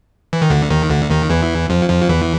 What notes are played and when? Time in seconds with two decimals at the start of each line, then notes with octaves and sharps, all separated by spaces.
0.33 E3
0.42 D#3
0.50 D2 D3
0.70 D#2 D#3
0.90 D2 D3
1.09 D#2 D#3
1.29 E2 E3
1.70 F2 F3
1.89 F2 F3
2.09 E2 E3